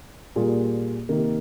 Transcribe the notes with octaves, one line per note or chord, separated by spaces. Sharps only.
A#2 G3 A#3 F4 G#4
C3 D#3 A#3